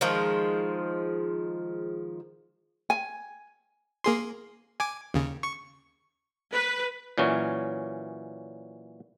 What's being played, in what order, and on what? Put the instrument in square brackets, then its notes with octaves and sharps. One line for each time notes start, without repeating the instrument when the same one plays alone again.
[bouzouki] D#3 F3 G#3
[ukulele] G#5
[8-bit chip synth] A#3 G#4 C6
G#5 D6
D#2 C#3
C#6
[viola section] B4
[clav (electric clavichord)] A#2 E3 F#3 C#4